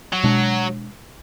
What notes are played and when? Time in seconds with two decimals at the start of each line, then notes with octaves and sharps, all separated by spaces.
0.13 F#3
0.23 B2 G#3 D4